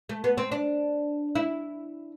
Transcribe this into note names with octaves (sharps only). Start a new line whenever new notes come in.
A3
B3
C4
D4
E4